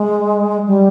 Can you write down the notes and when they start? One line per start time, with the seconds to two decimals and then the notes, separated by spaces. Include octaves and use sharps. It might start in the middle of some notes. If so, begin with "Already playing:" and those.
Already playing: G#3
0.66 G3